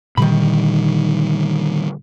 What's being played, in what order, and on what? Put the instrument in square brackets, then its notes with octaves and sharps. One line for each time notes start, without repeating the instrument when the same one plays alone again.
[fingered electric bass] A#2 D3 G3 [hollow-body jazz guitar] D#3 B5